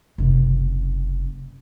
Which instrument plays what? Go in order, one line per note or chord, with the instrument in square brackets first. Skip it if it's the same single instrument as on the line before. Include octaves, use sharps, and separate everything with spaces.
[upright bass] F#1 C3